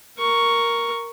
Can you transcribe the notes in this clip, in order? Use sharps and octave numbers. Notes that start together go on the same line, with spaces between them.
A#4 C#6